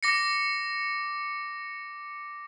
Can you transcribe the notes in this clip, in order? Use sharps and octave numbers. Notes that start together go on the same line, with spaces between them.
D6 A#6 C#7